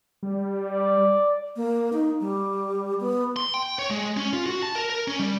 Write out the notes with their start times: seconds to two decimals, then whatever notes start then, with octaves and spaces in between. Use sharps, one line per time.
0.23 G3
0.69 D5
1.56 A#3
1.93 D#4
2.21 G3
3.00 B3
3.36 C6
3.54 G5
3.79 C#5
3.91 G#3
4.17 C#4
4.33 F4
4.46 F#4
4.63 A5
4.76 A#4
4.90 A#4
5.08 C#4
5.19 G3